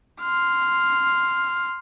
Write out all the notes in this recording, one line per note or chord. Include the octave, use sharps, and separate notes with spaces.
C6 F6